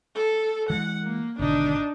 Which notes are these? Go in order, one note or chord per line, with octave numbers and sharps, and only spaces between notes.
A4
E3 G#3 F#5
A#3
G#1 B2 D3 D4 D#4